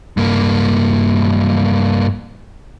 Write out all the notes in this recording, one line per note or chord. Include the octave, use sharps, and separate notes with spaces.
G2 A#3